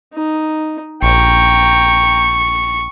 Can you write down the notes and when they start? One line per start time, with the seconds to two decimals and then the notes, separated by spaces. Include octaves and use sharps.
0.14 D#4
1.03 A#1 G5 A#5 C#6